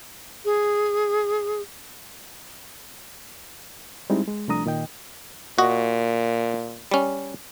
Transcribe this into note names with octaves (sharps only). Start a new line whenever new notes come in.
G#4
G3 G#3 C4 D#4 E4
G#3
C2 F3 A3 D4 A#5 D#6
A#2 D#3 D#5 G5
A#2 F#4 D#5 F#5
G3 C#4